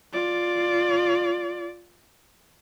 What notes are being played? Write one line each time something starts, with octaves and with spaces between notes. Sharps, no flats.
F4 D5